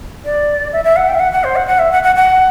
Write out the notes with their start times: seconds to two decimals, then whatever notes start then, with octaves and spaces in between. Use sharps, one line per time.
0.25 D5
0.73 E5
0.84 E5
0.96 F#5
1.08 G5
1.14 E5
1.20 F#5
1.32 F#5
1.44 C5
1.56 F#5
1.67 F#5
1.79 E5
1.92 F#5
2.03 F#5
2.16 F#5